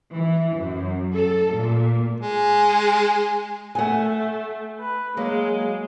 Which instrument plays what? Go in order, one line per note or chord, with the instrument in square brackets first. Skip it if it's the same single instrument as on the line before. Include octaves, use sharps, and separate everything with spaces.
[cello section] E3
F#2
A4
A#2
[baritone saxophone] G#3
[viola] A3 [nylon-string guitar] F#5 G#5
[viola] B4
[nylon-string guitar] F#3 A#3 [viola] G#3